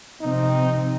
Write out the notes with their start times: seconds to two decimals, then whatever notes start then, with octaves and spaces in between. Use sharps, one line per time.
0.21 C3 F3 C4 D#4